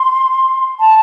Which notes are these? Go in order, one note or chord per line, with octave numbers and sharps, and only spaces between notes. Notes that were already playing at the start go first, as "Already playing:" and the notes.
Already playing: C6
A5